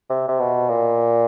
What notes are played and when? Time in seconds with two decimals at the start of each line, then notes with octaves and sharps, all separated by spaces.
0.10 C3
0.28 C3
0.40 B2
0.69 A#2